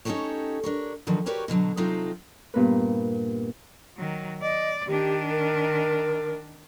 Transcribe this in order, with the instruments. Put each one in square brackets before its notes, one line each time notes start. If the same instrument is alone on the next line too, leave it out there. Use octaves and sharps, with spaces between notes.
[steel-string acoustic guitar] C#4 D#4 F#4 G4 A4 C#5
D4 A#4 C#5
D3 D#3 F3 F#3
F#4 G4 A#4 B4 C#5 D5
B2 D3 D#3 F#3
C3 F#3 C4 D#4 F4 A4
[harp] G2 A#2 B3 A#4 B4
[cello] D#3 F#3
[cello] D5 [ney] D#5
[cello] D#3 D4 [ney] G4
[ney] A#4